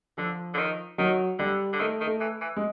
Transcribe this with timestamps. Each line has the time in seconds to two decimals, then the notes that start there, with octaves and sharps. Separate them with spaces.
0.18 D3 F3
0.54 D3
0.58 D#3
0.98 D#3 F#3
1.39 D3 G3
1.73 D3
1.80 D#3 A3
2.00 D#3
2.07 A3
2.20 E3
2.41 E3
2.57 G#3